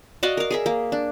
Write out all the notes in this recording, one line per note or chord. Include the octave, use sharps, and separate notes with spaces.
F#4 D5 D#5 F5
A#4 F5
G#4 A#4 E5
A#3
D4